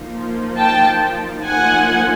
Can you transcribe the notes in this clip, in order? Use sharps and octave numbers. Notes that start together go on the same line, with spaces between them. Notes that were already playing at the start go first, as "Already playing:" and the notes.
Already playing: F3 A#3 D#4
G5 A5
F3 A#3 D#4 F#5 G#5